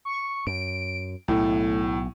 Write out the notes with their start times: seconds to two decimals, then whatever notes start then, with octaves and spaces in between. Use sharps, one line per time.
0.05 C#6
0.47 F#2 D7
1.28 B1 A2 A3